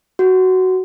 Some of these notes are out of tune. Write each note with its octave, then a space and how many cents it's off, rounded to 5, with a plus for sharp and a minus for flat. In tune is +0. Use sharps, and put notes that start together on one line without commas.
F#4 +10